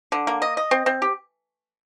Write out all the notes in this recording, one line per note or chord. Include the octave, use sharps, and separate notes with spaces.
D3
A#3
D#5
D#5
C4
C4
G4